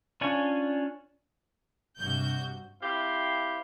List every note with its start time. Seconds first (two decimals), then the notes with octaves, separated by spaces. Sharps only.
0.21 C#4 D4 F4 C#5 G#5
1.98 G2 C3 F#4 G6
2.82 C4 E4 G4 C5 F5